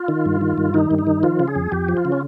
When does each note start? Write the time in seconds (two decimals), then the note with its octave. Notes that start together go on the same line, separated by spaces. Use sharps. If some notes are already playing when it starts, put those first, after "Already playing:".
Already playing: F4
0.08 D#3
0.26 G2
0.41 D#3
0.57 G2
0.74 D#3 D#4
0.91 G2
0.99 D#4
1.07 D#3
1.23 F3 F4
1.39 C#3
1.48 G#4
1.56 F2
1.72 F2 G4
1.88 F3
1.97 F4
2.05 C#3
2.12 C#4